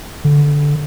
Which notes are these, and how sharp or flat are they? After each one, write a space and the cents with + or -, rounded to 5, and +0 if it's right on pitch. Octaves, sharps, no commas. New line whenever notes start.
D3 -10